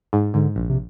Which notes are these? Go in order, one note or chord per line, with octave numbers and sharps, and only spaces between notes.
G#2
G#2 D3
A#1
C3